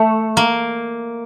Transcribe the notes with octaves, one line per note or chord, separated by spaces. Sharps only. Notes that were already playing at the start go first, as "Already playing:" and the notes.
Already playing: A3
A#3